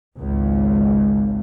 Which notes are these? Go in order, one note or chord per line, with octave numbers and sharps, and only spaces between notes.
G#1 C#2